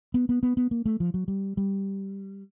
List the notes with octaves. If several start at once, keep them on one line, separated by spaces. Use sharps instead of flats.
B3
B3
B3
B3
A#3
A3
F3
F#3
G3
G3